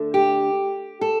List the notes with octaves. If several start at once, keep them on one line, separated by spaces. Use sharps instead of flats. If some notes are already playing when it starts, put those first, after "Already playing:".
Already playing: D2 D3 A3
G4
A4